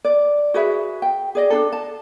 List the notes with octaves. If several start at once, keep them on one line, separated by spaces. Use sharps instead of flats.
D5
F#4 G#4 B4 E5
G5
G#4 D5 D#5
D4 D#4 A4
A5